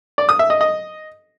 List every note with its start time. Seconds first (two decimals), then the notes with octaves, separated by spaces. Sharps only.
0.18 D5
0.29 D#6
0.39 E5
0.50 D#5
0.61 D#5